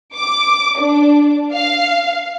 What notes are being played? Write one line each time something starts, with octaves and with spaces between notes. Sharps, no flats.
D6
D4
F5